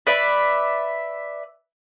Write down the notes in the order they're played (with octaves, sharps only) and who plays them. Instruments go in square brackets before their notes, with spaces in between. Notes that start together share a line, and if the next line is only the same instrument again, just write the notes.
[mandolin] B4 D5 E5